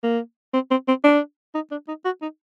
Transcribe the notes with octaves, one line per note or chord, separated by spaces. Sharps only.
A#3
C4
C4
C4
D4
D#4
D4
D#4
F#4
D#4